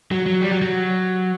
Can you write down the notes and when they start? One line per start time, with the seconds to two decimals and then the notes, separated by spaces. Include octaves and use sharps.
0.11 F#3
0.26 F#3
0.41 G3
0.52 F#3
0.62 F#3